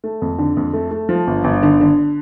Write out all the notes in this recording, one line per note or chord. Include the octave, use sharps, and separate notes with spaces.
A3
F2
D3
F2
A3
A3
F3
G1
G1
D3
D3